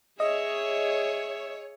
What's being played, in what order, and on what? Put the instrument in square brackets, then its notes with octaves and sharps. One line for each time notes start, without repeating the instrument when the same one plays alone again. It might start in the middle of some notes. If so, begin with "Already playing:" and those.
[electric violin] G#4 [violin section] C#5 [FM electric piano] D#5 [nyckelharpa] E5